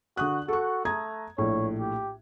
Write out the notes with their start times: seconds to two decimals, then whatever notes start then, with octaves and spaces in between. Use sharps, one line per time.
0.17 D3 F#4 D#6 F#6
0.48 F#4 A4 C#6
0.85 A3 A#5 D#6 G#6
1.38 A#1 A2 C#5
1.80 G4